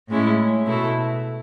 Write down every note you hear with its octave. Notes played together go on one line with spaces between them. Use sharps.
A2 G#3 C#4 E4
B2 A3 E4